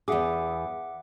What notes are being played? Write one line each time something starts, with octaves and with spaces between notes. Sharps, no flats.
E2 G#4 E5 F#5 D6